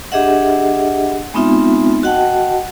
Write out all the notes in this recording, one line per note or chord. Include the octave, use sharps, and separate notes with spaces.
D4 G4 G#4 D#5 E5 F#5
G#3 B3 C4 D#4 F4 E5
F#4 D#5 F#5 G5 A5